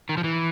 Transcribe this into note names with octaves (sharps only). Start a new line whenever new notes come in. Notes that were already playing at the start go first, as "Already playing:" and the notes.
D#3
F3
E3